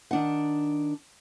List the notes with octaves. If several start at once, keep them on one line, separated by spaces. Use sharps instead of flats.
D#3 D4 F#5